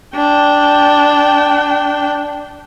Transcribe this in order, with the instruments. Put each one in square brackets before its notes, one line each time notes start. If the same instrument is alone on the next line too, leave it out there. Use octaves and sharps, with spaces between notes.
[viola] D4 G5